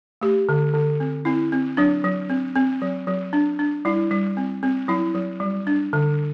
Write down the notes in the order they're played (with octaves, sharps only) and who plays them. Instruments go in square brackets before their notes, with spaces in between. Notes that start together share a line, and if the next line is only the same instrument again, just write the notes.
[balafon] A3 G4
D3
D3
C4
C4 E4
C4
F#3 D4
F#3
C4
C4
F#3
F#3
D4
D4
G3 E4
G3
C4
C4
F#3 E4
F#3
G3
D4
D3